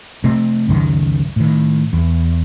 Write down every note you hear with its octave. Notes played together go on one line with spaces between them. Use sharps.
C3 A3 C4
C#2 F#2 D#3
A2 D#3
E2